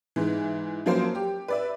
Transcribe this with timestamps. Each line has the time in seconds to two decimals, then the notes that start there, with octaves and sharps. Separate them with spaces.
0.16 G#2 E3
0.86 F3 F#3 A#3 C#4 C5
1.15 G4
1.48 B4 D5 E5